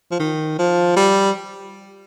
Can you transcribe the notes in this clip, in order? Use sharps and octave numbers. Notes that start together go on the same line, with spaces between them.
F3
D#3
F3
G3